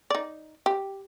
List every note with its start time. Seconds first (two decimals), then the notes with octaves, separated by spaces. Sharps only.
0.10 D#4 D5
0.66 G4